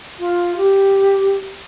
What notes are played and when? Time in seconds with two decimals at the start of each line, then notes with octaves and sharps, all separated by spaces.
0.19 F4
0.56 G4